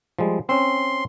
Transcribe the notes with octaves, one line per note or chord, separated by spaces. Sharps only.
F3 G3 G#3
C4 C#4 C6